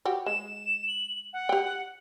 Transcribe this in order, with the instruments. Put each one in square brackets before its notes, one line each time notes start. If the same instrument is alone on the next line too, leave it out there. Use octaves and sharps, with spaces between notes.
[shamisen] F#4 G4
[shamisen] G#3 [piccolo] E7
[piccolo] F#7
F#5
[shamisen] G4 G5